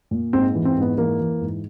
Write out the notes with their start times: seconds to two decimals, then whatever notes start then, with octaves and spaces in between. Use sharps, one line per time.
0.11 A#2
0.33 G#2 C4
0.55 E3
0.65 C4
0.77 G#2 B3
0.98 E3 A#3
1.20 E3
1.41 G#2